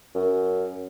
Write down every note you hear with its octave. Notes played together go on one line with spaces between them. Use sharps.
F#2